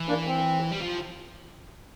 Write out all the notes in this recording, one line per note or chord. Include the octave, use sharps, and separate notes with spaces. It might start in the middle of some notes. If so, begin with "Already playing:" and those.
Already playing: E3
A#3 D4
C4
G3
F3